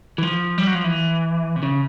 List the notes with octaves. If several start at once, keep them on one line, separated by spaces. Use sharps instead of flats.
E3
F3
G3
F#3
F3
E3
C3
C#3